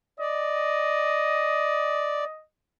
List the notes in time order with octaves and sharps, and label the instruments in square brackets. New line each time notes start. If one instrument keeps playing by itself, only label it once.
[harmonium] D5 [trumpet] D#5